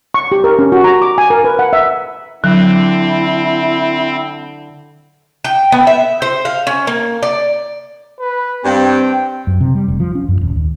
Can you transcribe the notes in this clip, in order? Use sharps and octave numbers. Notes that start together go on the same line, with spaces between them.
C#6
G4
A#4
C#4
F#4
A#5
D6
G#5
A#4
B4
F#5
E5
D3 F#3 C4 E4
G5
B3
E5
C5
F5
C#4
A#3
D5
B4
G2 C4 G5
F#2
C3
G3
F1
F3
C#4
F#2
D#1
D#2